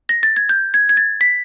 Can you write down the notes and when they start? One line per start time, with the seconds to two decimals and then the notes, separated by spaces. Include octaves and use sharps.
0.09 A#6
0.23 A6
0.36 G#6
0.49 G6
0.74 G#6
0.89 G#6
0.97 A6
1.21 B6